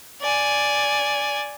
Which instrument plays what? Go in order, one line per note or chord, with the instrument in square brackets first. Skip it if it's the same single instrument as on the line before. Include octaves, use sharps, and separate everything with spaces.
[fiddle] D5 G#5